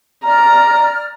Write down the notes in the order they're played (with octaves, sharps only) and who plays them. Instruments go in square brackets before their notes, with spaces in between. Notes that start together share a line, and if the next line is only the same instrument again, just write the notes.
[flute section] D5 F6 [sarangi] A#5